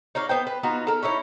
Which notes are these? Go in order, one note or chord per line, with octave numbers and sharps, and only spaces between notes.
D#4 C#5 D5 F5
B3 C5 G5
B4
B3 D#4 F4 F#4
A4 A#4
C#4 D#4 E4 C#5